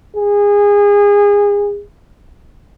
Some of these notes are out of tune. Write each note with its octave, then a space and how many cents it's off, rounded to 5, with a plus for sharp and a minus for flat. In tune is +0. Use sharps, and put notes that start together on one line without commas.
G#4 -25